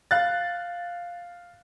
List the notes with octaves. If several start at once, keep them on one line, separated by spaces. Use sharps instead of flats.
F5 F#6 A6